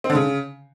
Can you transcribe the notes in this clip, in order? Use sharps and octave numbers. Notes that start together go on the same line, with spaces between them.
C4
D3
C#3